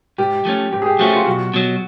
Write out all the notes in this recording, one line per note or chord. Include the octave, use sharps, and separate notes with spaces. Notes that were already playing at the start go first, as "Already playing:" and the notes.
G#2 G4
F3 A3 C#4
G#2 G4
G#4
G4
F3 A3 C#4 F#4
F4
B1 F#4
B2 F#3